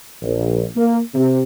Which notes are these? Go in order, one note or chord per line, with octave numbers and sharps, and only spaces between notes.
A#1
A#3
C3